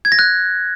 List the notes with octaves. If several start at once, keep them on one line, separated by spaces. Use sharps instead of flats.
G#6
A#6
F#6